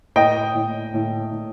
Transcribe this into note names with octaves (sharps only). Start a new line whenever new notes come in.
A2 D#5 G5
A2
A2
A2